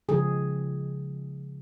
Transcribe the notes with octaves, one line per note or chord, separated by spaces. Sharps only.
C#3 F3 G#3 G#4